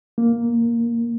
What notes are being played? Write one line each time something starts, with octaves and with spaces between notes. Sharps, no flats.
A#3